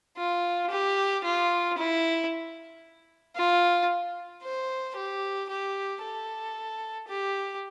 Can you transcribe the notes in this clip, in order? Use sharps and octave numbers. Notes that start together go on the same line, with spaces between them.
F4
G4
F4
E4
F4
C5
G4
G4
A4
G4